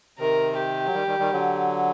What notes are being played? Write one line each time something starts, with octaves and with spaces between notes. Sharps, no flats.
C3 D#3 A#4
G4
F#3
D#3 G3
D#3 G3
D#3 G3
D3 F#3